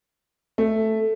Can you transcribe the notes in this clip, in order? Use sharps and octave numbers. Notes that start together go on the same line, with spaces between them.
A3